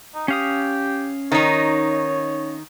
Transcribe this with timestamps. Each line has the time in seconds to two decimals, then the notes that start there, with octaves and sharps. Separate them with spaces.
0.14 D#4
0.28 C#4 G4 F5 D#6
1.32 D#3 D#4 C#5